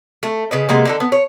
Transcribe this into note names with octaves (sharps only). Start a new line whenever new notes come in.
A3
C#3 B4 D#5
C3 G#3 A#3 B3
D3 D#4 A4
B3
C#5